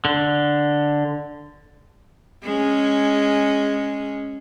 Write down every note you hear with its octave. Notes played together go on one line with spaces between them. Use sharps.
D3
G#3 C#4